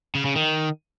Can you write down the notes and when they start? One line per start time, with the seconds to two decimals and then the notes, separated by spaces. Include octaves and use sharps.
0.15 C#3
0.25 C#3
0.36 D#3